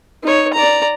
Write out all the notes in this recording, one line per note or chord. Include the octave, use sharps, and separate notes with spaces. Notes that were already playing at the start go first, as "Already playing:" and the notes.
D#4 C#5
D5 A#5